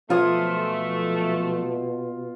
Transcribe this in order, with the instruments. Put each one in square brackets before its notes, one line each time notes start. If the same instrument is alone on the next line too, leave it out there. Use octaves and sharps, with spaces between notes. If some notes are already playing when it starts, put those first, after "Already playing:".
[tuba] B2 [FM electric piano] F3 F#3 G#5 [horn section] A3 [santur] F4 D#6